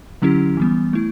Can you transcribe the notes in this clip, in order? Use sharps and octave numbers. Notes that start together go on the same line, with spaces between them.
D3 F#3 C#4 E4 G4
E3 G3 B3
A3 E4